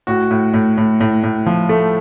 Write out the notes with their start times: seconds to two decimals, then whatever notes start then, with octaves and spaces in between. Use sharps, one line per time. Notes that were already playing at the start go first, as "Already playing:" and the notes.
0.07 A2 F#4
0.31 A2
0.54 A2
0.77 A2
1.00 A2
1.23 A2
1.46 F3
1.69 A3